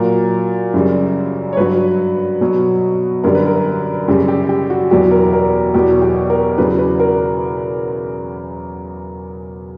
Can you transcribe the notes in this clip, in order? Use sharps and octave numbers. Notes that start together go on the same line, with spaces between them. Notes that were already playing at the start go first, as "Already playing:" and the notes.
Already playing: A#2 F#3 A#4
F#2 C#3 G3
C#5
G2 F#3 B4
B2 F#3
F#2 D3 G3 A#4
B4
A#4
F#2 C#3 G3 G4
G4
G4
F#4
E2 B2 F#3 G4
A#4
A#4
E2 B2 F#3 G4
G4
A#4
E2 C#3 F#3 B4
B4
A#4